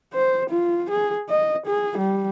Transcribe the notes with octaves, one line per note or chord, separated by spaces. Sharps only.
C5
F4
G#4
D#5
G#4
G3